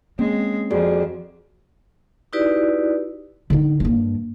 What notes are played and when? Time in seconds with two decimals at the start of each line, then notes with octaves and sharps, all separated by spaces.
0.19 G#3 A#3 C4 C#4
0.71 F2 F#4 G#4 D5
2.33 D#4 E4 F#4 G4 B4 D5
3.50 D3 D#4
3.80 G2 A#3